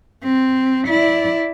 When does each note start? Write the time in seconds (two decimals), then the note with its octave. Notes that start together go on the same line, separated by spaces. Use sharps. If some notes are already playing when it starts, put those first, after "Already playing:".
0.23 C4
0.87 E4 D5